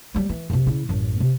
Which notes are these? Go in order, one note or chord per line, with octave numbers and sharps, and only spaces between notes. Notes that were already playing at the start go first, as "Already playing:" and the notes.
F#3 G3
E3
F#2 C3
C#3 E4
A1 F#2
C3